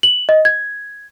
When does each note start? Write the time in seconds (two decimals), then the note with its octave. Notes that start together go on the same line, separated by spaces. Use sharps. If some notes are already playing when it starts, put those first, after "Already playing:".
0.03 F#7
0.29 D#5
0.45 G#6